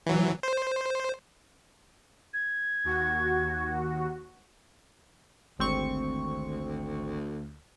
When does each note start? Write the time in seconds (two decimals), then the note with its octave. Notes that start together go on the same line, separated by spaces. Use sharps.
0.06 E3 F#3
0.43 C5
2.34 G#6
2.84 D#2 F#4
5.59 G#1 D2 C4 C#6